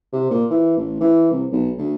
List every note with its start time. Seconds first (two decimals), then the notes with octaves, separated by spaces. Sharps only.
0.12 C3
0.30 A#2
0.50 E3
0.77 A1
1.00 E3
1.31 C2
1.52 B1
1.78 D2